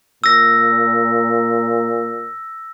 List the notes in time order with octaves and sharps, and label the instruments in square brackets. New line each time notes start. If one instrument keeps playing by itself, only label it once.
[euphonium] A#2 [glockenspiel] E6 A#6